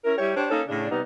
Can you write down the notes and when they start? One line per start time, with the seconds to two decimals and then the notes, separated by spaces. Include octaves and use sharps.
0.04 C#4 E4 A#4
0.17 G3 E4 G4 C#5
0.35 D4 G4 C5 C#5
0.51 A#3 C#4 D#4 A4
0.68 A2 C#3 D4
0.90 C3 G3 B3 D#4